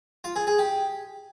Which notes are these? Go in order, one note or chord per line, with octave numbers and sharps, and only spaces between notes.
F4
G#4
G#4
G4